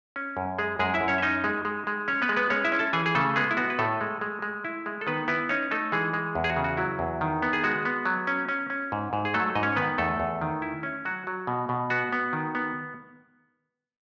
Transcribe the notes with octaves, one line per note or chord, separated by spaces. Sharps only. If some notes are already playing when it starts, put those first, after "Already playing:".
C#4
F#2
G#3 G#4
F#2 G#3 G#4
E4 E5
F#2
C#4 C#5
E5
C#4 D#4 D#5
G#3
G#3
G#3
C#4 C#5
B3 B4
G#3
B3 B4
G#3 C#4 C#5
E4 E5
C#4
A4 A5
E3 G#4 G#5
G#4
C#3 A3 A4
G#3 B3 G#4
E4
B3 F#4
B4
A2 A3 A4
G#3
G#3
G#3
E4
G#3
A4
D#3 B3 B4
B3 E4 B4
C#4 D#4 C#5
A3 D#4 A4
E3 G#3 G#4
G#3
E2
G#4
F#4
C#3
F#4
F#3 E4
E2
D#3
B3
G#4
G#3 F#4
B3
F#3
C#4
C#4
C#4
G#2
G#2
G#4
F#3 A3 A4
G#2 D#5
C#4 C#5
D#3 B3 B4
E2 A3 A4
E2
D#3
E4
C#4
F#3 F#4
F#3
B2
B2
B3 F#4
B3
D#3
B3